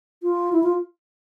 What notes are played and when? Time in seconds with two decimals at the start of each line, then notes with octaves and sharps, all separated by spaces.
0.23 F4
0.52 E4
0.63 F4